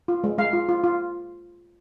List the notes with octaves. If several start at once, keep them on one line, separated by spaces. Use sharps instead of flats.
F4
G#3
G#3 F5
F4
F4
F4